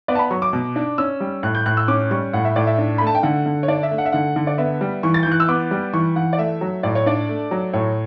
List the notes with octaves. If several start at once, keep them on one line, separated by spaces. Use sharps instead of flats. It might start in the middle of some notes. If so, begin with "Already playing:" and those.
B3 D5
A5
B5
F#3 C#6
D6
B2
D4
C#4 E6
G3
A2 F#6
G6
A2 F#6
E6
C#4 D6
G3 C#6
A2 F#5
E5
A2 D5
E5
D4
A3 B5
A5
G5
D3 F#5
D3
C#5
D4 D5
E5
A3
F#5
E5
D3 F#5
D3
D5
B3 E5
G3
E3 C#6
A6
E3 G6
F#6
E6
B3 D6
G3
E3 C#6
E3 F#5
D5
A3 E5
F#3
A2 D5
C#5
D4 D5
A3
F#3
A2 C#5